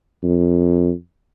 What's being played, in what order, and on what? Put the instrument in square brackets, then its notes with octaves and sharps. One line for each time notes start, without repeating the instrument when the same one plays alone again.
[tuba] F2